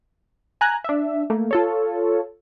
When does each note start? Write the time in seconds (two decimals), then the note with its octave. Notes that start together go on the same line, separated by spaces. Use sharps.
0.61 G#5 A#5 F#6
0.84 D4 E5
1.30 A3 A#3
1.51 F4 A4 C#5